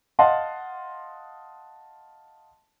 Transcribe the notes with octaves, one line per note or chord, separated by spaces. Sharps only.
D#5 F5 F#5 A5 C6